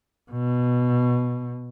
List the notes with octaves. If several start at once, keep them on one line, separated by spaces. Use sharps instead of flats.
B2